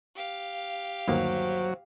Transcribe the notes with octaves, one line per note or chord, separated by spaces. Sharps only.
G4 F5
G1 D#2 F#3 A#3 C5